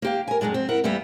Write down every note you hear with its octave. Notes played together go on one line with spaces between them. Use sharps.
A#3 G4 F5
A#4 G#5
F2 D#3 F#3 G#3 D4
C4
E4 A#4 F#5
E2 G3 A#3 B3 E5